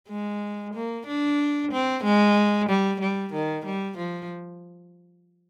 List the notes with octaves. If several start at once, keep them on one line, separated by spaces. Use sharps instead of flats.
G#3
A#3
D4
C4
G#3
G3
G3
D#3
G3
F3